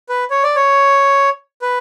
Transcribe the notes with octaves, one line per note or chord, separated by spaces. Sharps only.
B4
C#5
D5
C#5
B4